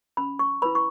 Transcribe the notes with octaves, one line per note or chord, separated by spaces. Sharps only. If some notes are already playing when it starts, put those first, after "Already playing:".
C#4 B5
C#6
E4 B4 B5
C#6